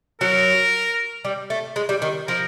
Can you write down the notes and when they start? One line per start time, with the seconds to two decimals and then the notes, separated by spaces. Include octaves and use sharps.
0.21 F#3 A#4
1.25 G3
1.50 A3
1.76 G#3
1.89 G3
2.02 D#3
2.28 F3 A#4